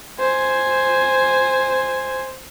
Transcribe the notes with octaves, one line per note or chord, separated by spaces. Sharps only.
C5 G#5